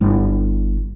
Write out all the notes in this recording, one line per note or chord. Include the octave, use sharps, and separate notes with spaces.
G1 E4